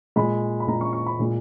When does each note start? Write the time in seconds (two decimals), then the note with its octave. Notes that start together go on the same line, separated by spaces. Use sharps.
0.16 A#2 G#3 B5
0.60 B5
0.67 A#2 G#3 A#5
0.81 C#6
0.93 C#6
1.06 B5
1.19 A#2 G#3